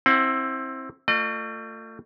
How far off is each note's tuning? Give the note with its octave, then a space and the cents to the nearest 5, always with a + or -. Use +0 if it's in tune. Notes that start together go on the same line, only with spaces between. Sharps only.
C4 +20 E4 -10 F#5 +0
A3 +30 F4 +0 D#5 -45